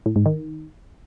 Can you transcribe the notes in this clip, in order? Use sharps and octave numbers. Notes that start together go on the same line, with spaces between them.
A2
G#2
D#3